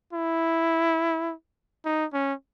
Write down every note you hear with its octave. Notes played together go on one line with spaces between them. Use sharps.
E4
D#4
C#4